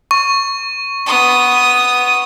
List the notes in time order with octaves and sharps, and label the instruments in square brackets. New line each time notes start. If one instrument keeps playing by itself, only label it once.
[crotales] C#6
[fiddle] B3 D#6